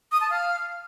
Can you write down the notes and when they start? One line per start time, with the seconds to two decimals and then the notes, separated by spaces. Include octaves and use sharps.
0.12 D#6
0.21 A5
0.30 F5